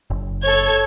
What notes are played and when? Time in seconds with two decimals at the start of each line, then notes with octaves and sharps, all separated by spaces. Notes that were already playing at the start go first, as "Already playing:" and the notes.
0.10 F#1
0.42 A4 C#5 G#6